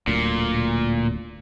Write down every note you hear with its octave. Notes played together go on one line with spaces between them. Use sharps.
D1 D2 A#2